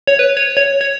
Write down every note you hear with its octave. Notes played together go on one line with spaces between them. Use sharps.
C#5
B4
C#5
C#5
C#5